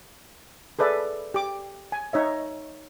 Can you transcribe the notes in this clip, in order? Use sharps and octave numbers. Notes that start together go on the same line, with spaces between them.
G#4 A4 B4 D5 E5
G4 D6
G#5
D#4 C#5 E5